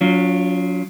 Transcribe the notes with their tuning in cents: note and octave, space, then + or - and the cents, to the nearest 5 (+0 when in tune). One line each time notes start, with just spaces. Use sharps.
F#3 -20 C#4 +40 F4 +0